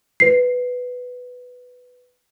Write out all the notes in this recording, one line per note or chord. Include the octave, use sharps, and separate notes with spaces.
B4 C7